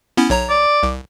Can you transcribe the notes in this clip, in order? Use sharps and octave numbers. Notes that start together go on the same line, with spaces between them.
B3 C#4 E4
B1 C#5 A#5
D5
C2